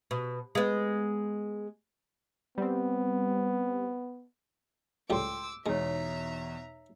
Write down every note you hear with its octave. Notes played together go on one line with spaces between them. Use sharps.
B2
G#3 B3
G3 B3 C4
C#2 A2 G3 G5 C6 D6 E6
E2 B2 G#3 D#4 C#5 E5 A#5